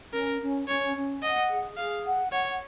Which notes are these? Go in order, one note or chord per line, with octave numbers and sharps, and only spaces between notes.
C#4 A#4
C#4
C#4 C#5
C#4
D#5 F#5
G#4
G#4 F5
F#5
C#5 F#5